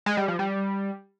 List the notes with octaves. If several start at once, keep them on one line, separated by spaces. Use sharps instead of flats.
G#3
G3
F3
G3